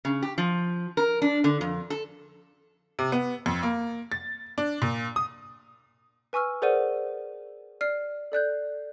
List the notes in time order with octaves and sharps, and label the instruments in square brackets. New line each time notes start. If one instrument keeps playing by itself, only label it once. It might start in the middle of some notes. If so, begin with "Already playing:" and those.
[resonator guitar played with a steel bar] C#3
G4
F3
A#4
D4
D3
F2
A4
[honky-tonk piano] C3
B3
F2
A#3
A6
D4
A#2
D#6
[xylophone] B4 G#5 C#6 E6 F6
G#4 A#4 C5 D5 F#5 D#7
D5 F6 C7
A4 D5 F#6 G6